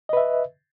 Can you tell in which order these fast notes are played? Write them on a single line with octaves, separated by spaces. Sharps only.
D#5 B4 E5